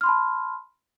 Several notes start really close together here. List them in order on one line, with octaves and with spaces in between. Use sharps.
F6 C6 B5 A5